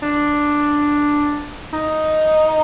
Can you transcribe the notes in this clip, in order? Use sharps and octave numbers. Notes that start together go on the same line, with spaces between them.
D4
D#4